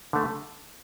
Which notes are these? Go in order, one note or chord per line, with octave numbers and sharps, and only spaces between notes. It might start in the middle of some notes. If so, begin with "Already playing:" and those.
D3 A3